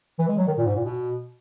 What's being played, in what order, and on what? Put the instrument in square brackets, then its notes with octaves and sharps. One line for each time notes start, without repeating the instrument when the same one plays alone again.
[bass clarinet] E3
G#3
F#3
D#3
A#2
G#2
A#2
B2